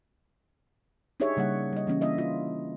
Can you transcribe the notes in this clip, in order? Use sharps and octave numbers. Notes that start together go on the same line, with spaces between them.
D4 D#4 G4 G#4 C#5 E5
C#3 G3 A#3 F#5
G3 D#5
E3 A#3 C#4
A#3 D4 E4 D#5 E5
F4